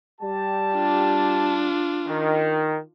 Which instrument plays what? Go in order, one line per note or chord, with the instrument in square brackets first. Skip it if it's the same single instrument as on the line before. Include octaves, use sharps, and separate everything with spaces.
[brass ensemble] G3 G4 A5
[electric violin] D4 F4
[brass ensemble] D#3